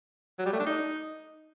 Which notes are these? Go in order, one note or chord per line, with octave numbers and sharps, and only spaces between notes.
F#3
G3
A3
D4
D#4